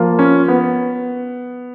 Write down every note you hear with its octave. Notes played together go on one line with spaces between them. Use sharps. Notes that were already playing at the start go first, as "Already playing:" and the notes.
Already playing: F3 A#3 F4
C#4
B3